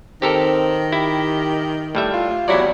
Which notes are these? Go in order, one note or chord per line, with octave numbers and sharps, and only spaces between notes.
D#3 C4 G4 A4 A#4
E4 G4
A2 G3 E5
F4
E2 F#3 G3 E4 D5